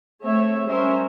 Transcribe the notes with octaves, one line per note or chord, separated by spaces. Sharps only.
A3 C4 C#5 E5
G3 C#4 A#4 C5 E5